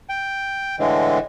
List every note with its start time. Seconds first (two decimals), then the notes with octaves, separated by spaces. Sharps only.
0.09 G5
0.79 A2 D3 E3 G#3